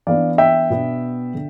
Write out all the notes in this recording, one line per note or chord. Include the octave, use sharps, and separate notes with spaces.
E3 B3 D4 D5 F5
E5 G5
B2 B3 D4
D3